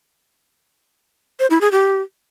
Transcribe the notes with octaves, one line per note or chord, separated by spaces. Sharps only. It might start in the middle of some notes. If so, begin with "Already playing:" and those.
C5
E4
G#4
G4